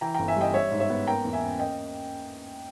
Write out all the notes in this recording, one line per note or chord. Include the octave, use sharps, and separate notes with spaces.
E3 G5 A#5
G1 G5 A#5
E5 G#5
G3 D#5 G5
G3 C#5 E5
G#2
C#5 E5
B3
A#3 G5 A#5
E2
E5 G#5
C#4
A#3 D#5 G5